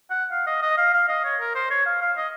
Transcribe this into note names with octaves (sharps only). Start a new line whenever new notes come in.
F#5
F5
D#5
D#5
F5
F5
D#5
C#5
A#4
C5
C#5
F5
F5
D#5